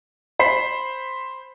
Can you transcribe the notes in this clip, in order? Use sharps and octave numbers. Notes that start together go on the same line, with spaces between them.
C5 B5 B6 C7